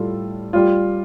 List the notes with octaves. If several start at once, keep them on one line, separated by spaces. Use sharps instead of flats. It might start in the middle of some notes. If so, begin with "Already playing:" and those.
Already playing: A2 G3 F4 A4
G3 F4